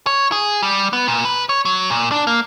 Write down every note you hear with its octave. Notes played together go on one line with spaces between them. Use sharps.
C#5
G#4
G3
B3
A#2
B4
C#5
F#3
A#2
D4
A#3